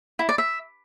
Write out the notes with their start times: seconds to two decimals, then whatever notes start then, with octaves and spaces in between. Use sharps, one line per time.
0.19 E4
0.29 D5
0.38 E5